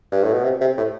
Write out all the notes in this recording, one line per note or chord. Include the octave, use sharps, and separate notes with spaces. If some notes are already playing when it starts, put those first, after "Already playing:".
G2
A2
B2
C3
C3
A2